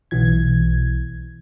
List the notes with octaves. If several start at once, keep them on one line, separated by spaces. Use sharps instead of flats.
B1 B2 E3 G#6